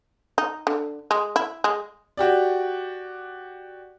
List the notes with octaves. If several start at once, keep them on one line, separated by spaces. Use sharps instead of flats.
D#4
D3
G#3
E4
G#3
F#4 G4 D5